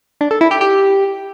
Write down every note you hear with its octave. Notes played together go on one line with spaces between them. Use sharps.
D4
A4
E4
G4
G4